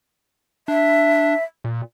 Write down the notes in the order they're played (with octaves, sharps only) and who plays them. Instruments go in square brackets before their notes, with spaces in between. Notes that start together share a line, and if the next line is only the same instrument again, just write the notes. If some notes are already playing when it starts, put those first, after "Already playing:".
[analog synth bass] D4 [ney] E5
[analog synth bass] A#2